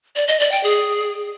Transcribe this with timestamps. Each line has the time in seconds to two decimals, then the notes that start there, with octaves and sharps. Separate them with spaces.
0.16 D5
0.28 D#5
0.40 D5
0.52 G5
0.63 G#4